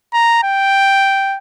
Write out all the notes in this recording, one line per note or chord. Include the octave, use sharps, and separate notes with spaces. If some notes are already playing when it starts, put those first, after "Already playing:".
A#5
G5